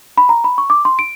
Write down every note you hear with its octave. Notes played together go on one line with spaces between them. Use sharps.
B5
A#5
B5
C#6
D6
C6
D7